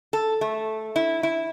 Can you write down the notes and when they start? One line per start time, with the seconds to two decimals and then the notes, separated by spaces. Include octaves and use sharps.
0.13 A4
0.41 A3
0.96 E4
1.23 E4